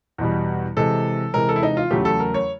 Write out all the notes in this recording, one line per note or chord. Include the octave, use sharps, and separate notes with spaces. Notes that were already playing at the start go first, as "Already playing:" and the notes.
E2 B2 G3
C3 E3 G#3 A4
C3 E3 G#3 A#4
A4
E4
D#4
F4
E2 C#3 F#3 A3 G4
A4
A#4
C#5